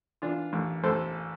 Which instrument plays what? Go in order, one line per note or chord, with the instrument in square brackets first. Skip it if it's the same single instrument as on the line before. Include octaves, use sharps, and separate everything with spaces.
[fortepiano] E3 D4 F4
A1
A1 A4 C5